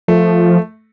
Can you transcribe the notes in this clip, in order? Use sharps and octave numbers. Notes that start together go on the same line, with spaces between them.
F3 A3